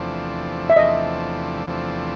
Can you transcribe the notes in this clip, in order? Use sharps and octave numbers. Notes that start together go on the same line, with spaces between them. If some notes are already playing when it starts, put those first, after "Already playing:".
Already playing: E2 C3 F3 A3 D4
E5
E2 C3 F3 A3 D4 D#5
E2 C3 F3 A3 D4